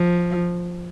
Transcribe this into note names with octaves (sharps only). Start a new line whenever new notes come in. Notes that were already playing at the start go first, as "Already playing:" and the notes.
Already playing: F3